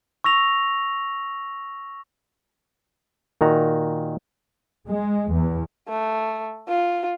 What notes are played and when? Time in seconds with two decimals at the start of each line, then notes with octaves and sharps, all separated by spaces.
0.24 C#6 E6 A#6 F7
3.41 A#2 D#3 F#4 A#5
4.88 G#3
5.33 E2
5.89 A3
6.68 F4